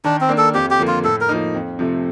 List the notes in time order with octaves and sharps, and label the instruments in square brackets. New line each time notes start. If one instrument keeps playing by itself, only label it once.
[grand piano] D#3 [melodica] D4
[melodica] C4
[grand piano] A#3 D4
[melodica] A4
[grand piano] F2 [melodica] G4
[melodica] G4
[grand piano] D3 F3 A#3
[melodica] F4
[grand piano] A2 [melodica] A4
[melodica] A#4
[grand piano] F3 A#3 D#4
F2
C3 F3 A3